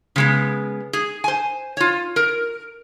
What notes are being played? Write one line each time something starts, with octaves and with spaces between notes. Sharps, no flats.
C#3 G#3 B3
G#4
C5 G#5
F4 C#5
A#4